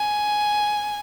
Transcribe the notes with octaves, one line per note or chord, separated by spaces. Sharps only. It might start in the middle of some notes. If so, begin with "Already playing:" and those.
Already playing: G#5